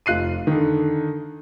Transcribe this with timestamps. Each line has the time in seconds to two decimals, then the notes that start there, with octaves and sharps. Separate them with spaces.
0.06 F1 F4 F#6 C7 D#7
0.47 D3 D#3